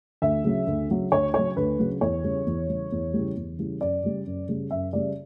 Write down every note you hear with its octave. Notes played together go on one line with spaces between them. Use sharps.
D2 E5
C#3 F#3
D2
C#3 F#3
D2 C#5
C#3 F#3 C#5
D2 B4
C#3 F#3
E2 C#5
C#3 E3 G3
E2
C#3 E3 G3
E2
C#3 E3 G3
E2
C#3 E3 G3
F#2 D5
C#3 G3
F#2
C#3 G3
F#2 E5
C#3 G3 D5